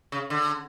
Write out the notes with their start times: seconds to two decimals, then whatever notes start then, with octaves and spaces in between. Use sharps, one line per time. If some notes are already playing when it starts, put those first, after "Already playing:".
0.12 C#3
0.30 D3